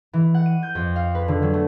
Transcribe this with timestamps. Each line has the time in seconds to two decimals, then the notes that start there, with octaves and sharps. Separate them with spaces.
0.13 E3
0.34 F#5
0.46 D#7
0.63 G6
0.75 F2
0.96 F5
1.15 B4
1.28 D3
1.42 F#3
1.54 A3